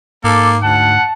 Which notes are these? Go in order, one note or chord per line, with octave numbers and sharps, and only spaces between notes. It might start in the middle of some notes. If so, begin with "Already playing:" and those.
G#2 A#3 A4 D6
D2 F#5 A5